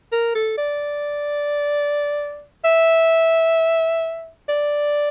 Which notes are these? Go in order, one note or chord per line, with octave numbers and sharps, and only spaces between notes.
A#4
A4
D5
E5
D5